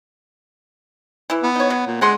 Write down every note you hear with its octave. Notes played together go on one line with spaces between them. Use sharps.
E3 E4
B3
D#4 C#5
F#3
A#2
D3 G#3 F#5 C6